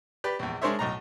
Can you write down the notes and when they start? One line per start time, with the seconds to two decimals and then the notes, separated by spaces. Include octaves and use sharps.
0.24 G4 B4 D5
0.39 A#1 E2
0.62 G#3 D4 A#4 C5 C#5 E5
0.79 B1 A2 A#5